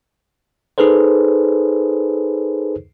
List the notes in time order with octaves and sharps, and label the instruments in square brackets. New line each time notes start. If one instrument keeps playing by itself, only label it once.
[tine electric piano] D#4 G#4 A4 B4 C5